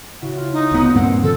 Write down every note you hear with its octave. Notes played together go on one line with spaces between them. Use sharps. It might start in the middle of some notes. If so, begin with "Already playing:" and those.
C#3 E4 F#4
F4
D#4
D2 B3
G2 A#2 A#3 C4 F#5 G#6
D3 F3 A4 A#4